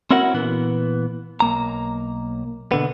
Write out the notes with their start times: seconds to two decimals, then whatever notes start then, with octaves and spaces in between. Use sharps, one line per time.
0.11 C4 C#4 E4 F#4 A#4 F#5
0.34 A#2 E3 B3
1.40 B1 A#3 A#5
2.72 B2 D3 B3